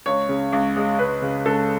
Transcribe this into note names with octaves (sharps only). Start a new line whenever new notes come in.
C#2 C#5
C#3
C#2
G#3
C#2 B4
C#3
C#2 A4